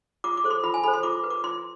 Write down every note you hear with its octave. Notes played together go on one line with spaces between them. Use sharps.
F4 D6
D6
A4 C5
C6
F4 B5
G#5
A4 C5 B5
C6
F4 D6
B4
D6
F4 C6